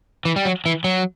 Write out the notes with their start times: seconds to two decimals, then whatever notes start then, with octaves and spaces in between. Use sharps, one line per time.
0.25 E3
0.36 G3
0.45 F#3
0.66 E3
0.84 F#3